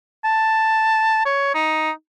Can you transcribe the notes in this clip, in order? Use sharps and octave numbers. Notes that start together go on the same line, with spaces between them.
A5
C#5
D#4